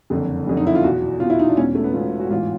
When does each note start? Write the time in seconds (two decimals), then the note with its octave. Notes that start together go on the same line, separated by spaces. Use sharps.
0.10 F#1 F2 D3
0.47 F#1 F2 D3
0.57 D#4
0.67 E4
0.75 F4
0.83 E2 B2 F#4
1.20 E2 B2 F4
1.30 E4
1.39 D#4
1.48 D4
1.57 E1 E2 B2 C#4
1.75 A3
1.84 B3
1.93 E1 E2 B2 F4
2.20 F#4
2.30 A1 G#2 E3 F4